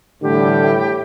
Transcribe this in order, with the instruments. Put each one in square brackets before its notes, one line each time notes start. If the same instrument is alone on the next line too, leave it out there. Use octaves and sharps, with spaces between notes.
[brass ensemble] A2 [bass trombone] D3 [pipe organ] E3 G3 [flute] G4